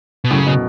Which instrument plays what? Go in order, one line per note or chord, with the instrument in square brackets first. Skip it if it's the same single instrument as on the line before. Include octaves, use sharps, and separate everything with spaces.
[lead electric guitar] B2
[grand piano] F#2 A2 [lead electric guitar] C#3
[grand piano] B2